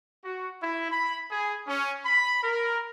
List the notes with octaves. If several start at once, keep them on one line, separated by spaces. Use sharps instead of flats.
F#4
E4
B5
G#4
C#4
B5
A#4